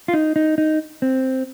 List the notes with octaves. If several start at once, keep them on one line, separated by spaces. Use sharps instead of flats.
F4
D#4
D#4
D#4
C4